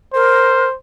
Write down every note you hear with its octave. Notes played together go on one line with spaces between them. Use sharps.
A#4 C5